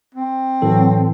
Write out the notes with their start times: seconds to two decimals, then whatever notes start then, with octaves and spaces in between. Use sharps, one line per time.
0.15 C4
0.62 A2 E3 F#3 A4